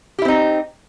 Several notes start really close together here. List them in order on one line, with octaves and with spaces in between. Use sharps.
G4 E4 C4 D#4